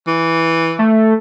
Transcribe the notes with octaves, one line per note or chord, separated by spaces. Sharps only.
E3
A3